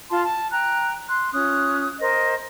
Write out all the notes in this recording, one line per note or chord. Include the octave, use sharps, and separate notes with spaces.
F4 A5 C6
A5
G5 A#5 F#6
C6 F#6
C#4 F4 D#6 F#6
A#4 C5 D#5